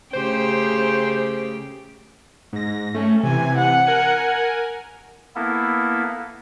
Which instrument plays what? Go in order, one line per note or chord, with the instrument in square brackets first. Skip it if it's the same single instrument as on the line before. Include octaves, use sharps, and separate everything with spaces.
[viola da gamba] C#3 A3 G4 [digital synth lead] C5
[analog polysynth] G#2 A#6
[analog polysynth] A3 [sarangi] C#4
[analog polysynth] C3 E3 [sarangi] G#5
[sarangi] F#5
[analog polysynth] A#4 G#5
[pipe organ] A#3 B3 E4 A4